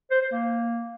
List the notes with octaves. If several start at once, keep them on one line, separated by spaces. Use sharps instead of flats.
C5
C5
A#3